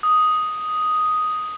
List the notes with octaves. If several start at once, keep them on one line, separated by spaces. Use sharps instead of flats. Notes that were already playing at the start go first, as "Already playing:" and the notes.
D#6